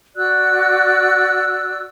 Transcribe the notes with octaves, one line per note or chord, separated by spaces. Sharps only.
F#4 D5 E6 F#6